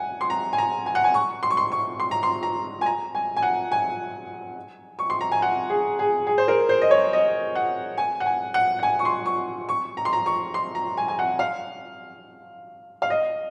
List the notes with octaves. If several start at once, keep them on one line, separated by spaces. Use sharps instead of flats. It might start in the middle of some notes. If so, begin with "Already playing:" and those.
Already playing: F#5 G#5
C6
A#5
G#5
A#5
G#5
F#5
G#5
C#6
C6
C#6
C6
C#6
C6
A#5
C6
A#5
G#5
A#5
G#5
G#5
F#5
G#5
C#6
C6
A#5
G#5
F#5
G#4
G#4
G#4
C5
A#4
C5
D#5
C#5
D#5
F#5
G#5
F#5
G#5
F#5
F#5
G#5
C#6
C6
C#6
C#6
A#5
C6
A#5
C#6
C6
A#5
G#5
G#5
F#5
F5
F5
D#5